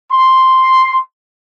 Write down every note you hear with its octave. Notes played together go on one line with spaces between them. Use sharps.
C6